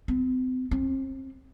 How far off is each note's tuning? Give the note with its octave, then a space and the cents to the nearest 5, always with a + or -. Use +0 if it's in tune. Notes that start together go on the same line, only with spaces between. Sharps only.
C4 -40
C4 +35